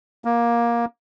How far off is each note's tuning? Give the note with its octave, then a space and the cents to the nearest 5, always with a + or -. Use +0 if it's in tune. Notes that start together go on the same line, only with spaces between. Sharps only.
A#3 +15